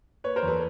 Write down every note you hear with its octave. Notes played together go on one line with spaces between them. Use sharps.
A#3 B4 C#5
A#4 C5
E2
A4 B4